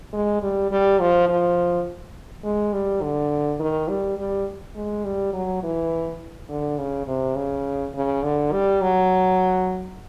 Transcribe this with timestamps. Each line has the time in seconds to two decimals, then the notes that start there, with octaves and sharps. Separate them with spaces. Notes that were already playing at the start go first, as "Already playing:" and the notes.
0.13 G#3
0.42 G3
0.71 G3
1.00 F3
1.28 F3
2.44 G#3
2.73 G3
3.02 D3
3.59 D#3
3.89 G3
4.18 G3
4.75 G#3
5.05 G3
5.33 F#3
5.63 E3
6.49 D3
6.78 C#3
7.07 C3
7.36 C#3
7.94 C#3
8.23 D3
8.52 G3
8.81 F#3